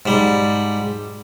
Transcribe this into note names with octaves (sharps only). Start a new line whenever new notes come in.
G#2 G3